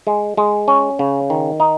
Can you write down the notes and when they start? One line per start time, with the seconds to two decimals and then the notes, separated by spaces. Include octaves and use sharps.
0.07 G#3
0.37 G#3
0.68 C#4
0.99 C#3
1.30 D#3
1.60 D#4